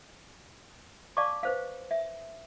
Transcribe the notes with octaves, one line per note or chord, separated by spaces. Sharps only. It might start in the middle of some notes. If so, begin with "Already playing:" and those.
D5 F5 A5 C#6 D6
B4 C5 F5
E5